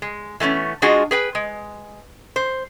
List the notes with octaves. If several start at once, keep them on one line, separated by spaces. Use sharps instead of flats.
G#3
E3 A3 B3 C#4
G#3 D4 F4 F#4 G#4 D#5
G#4 B4 G5
G#3
C5